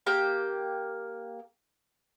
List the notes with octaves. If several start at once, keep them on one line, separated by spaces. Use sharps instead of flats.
A#3 G4 G5